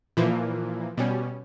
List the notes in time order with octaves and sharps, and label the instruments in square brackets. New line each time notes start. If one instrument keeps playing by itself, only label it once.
[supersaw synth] A#2 E3 F3 A#3
B2 G3 C#4